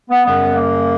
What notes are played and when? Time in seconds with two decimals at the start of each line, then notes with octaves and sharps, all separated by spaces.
0.10 B3
0.25 F#2 C#3 G3 B3
0.56 A#3